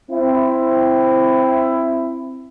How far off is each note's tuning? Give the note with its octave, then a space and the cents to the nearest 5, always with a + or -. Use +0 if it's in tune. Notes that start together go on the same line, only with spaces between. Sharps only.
C4 +0 E4 +15